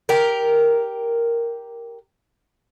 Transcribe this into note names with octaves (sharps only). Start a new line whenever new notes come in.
G4 A#4